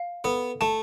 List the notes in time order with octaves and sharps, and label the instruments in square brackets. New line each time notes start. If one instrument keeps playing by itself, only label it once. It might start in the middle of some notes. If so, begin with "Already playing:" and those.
Already playing: [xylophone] F5
[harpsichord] B3 [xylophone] A4
[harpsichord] A3 [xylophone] A5